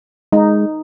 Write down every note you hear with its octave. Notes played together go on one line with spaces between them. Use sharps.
G#3 D#4